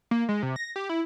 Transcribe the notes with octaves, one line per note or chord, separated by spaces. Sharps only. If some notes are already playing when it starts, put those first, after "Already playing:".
A#3
G#3
C3
A#6
G4
E4